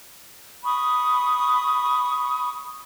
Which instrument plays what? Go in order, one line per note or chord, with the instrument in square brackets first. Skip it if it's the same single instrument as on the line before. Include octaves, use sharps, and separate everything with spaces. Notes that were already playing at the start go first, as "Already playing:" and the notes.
[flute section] B5 C#6 D#6